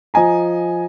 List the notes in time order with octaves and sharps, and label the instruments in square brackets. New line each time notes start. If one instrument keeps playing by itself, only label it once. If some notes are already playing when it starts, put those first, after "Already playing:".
[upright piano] F3 D#5 G#5 A#5